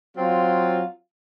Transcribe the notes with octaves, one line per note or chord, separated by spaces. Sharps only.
F#3 C4 F4